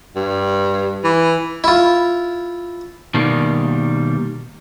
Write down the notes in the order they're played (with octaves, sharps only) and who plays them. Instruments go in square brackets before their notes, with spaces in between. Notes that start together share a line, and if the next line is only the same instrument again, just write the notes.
[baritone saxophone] G2
E3
[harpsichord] E4 F4
[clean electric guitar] B2 D#3 G3 A#3